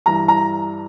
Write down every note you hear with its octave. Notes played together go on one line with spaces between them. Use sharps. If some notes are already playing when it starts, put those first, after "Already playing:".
G2 E3 A#5
A#5